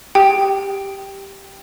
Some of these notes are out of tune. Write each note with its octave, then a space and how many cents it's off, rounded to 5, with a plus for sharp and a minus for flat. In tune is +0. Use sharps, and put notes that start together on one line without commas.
G4 +0 G5 +0 D#6 +5